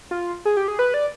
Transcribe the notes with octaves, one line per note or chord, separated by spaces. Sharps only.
F4
G#4
G4
G#4
B4
D5